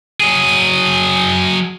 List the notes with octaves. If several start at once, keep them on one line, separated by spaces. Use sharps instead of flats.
F#3 G#4